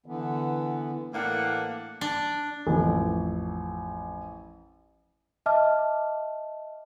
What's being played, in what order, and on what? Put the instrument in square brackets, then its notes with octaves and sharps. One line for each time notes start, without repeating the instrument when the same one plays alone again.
[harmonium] D3 E3 B3
[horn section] A2 E3 A#3 D4 F#5
[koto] D4
[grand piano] A1 F2
[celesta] D#5 E5 A5 D6 F6